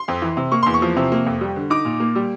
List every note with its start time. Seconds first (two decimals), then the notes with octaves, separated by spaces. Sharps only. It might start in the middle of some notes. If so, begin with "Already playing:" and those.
Already playing: C6
0.08 F2
0.22 E3
0.37 C3
0.52 A#3 C#6
0.63 E2 C6
0.74 C#6
0.82 F3
0.96 C3
1.12 A#3
1.26 F2
1.41 G3
1.56 D3
1.70 D#4 D6
1.85 A#2
2.00 A#3
2.15 G3